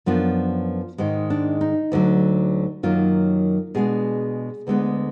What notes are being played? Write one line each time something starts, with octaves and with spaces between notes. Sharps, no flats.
F#2 F3 B3 D4 F4
G#2 D#3 G#3
D4
D#4
D2 D3 F#3
F#2 D#3 F#3 A#3 F4
B2 G#3 D4 G#4
D2 D3 G#3 B3 D4